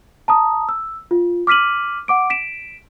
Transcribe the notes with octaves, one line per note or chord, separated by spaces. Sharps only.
A5 A#5 D#6
E6
F4
D6 F6 B6 D#7 F#7
F#5 D6 D7
B6 D7 E7